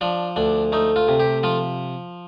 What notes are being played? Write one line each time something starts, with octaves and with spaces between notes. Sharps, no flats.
F3 D4
D2 D4
A3 D#4
F4
C3
G4
F3 F4